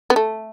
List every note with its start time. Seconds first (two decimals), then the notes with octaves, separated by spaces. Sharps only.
0.10 B3
0.16 A3